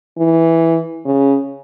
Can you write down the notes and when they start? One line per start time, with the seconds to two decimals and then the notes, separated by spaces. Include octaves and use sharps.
0.18 E3
1.05 C#3